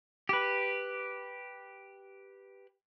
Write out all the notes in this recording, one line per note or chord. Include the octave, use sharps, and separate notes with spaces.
G4 B4